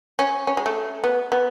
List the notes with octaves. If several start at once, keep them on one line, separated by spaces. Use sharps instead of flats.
C#4
C#4
G#3
A3
B3
B3